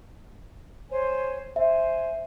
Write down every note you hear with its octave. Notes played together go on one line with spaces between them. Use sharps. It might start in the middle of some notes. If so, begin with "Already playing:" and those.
C5 C#5 G#5
C5 E5 G#5